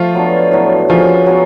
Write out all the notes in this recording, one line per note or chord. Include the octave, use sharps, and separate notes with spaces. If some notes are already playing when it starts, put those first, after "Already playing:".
Already playing: F3 A3 F4
F#3 B3 D4
A2 F#3 B3
F3 F#3 C#4 F4 G#4 B4
F#3 B3 F#4